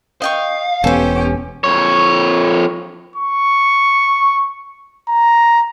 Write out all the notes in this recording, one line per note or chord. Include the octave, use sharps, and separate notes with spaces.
D#5 F5 G5 C#6
E1 B3 C#4 G4 A4 C5
F2 C#5
C#6
A#5